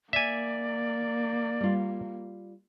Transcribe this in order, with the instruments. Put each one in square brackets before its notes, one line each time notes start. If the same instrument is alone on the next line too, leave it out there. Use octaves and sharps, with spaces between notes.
[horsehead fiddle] A#3 [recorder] D5 [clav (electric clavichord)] E5 G#5
[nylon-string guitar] G3 F4